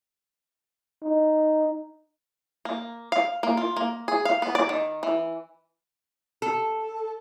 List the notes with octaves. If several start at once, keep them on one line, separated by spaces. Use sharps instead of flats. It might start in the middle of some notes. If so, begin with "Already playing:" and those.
D#4
A#3
F5
A#3
F4
A#3
G#4
F5
B3
D5
D#3
E3
A4